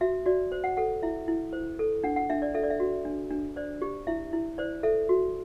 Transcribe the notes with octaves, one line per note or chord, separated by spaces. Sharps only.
F#4 E5
F#4 D5
C5
F#5
A4 F#5
E4 E5
E4
C5
A4
D4 F#5
F#5
D4 E5
D5
A4 E5
D5
E5
F#4
D4
D4
C5 D5
G4
E4 E5
E4
C5 D5
A4 E5
F#4